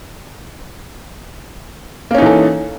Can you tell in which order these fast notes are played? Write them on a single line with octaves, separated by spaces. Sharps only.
A#3 C#4 D#4 E3 A4